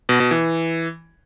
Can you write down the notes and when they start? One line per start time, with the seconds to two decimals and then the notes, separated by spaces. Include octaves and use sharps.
0.09 B2
0.20 B2
0.31 E3